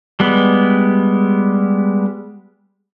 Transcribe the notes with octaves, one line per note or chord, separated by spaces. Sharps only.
G3 G#3 B3